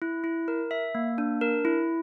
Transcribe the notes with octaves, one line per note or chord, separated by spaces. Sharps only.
E4
E4
A#4
E5
A#3
D4
A#4
E4